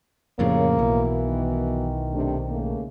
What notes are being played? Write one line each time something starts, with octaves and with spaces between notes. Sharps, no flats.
F2 A2 C#3 F3 G3 A#3 C#5
B1 E3 B3 F#4
D#3
C3 A3 D4
C#3 A3 A#3